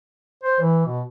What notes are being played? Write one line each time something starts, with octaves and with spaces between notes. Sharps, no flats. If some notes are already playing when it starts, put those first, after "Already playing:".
C5
E3
B2